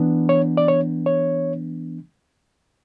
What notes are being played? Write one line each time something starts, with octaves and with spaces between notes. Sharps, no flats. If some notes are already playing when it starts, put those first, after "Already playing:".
Already playing: E3 B3 D4
C#5
D5
C#5
C#5